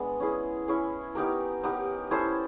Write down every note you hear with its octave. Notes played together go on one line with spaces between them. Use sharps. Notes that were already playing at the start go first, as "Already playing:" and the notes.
Already playing: G#3 B3 D4
C#4 E4 G#4
C#4 E4 G#4
B3 D#4 G4 A#4
B3 D#4 G4 A#4
C#4 E4 A4 C5